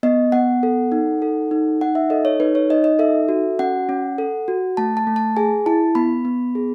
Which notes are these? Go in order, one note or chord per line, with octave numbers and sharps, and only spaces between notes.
B3 D#5
B3 F#5
A4
D#4
A4
D#4
D#4 F#5
E5
A4 D#5
C#5
D#4 B4
C#5
D#4 D#5
D#5
A4 E5
F#4
C#4 F#5
C#4
A4
F#4
A3 A5
A5
A3
A5
G#4 G#5
E4 A5
B3 B5
B3
G#4